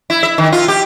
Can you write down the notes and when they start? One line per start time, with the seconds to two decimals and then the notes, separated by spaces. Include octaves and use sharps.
0.10 E4
0.23 E5
0.38 D#3
0.52 F4
0.68 G4